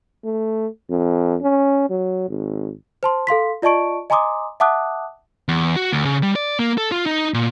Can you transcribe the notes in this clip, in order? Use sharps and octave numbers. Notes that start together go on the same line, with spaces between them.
A3
F2
C#4
F#3
G#1
C5 A5 C6
A4 F5 C6 B6
F4 D5 D#5 A5 C#6 D7
D#5 G#5 A#5 C6 D6 D#6
E5 F#5 A5 D6 D#6 F#6
E2
F#4
D2
C#3
G3
D5
A#3
A4
F4
D#4
A#2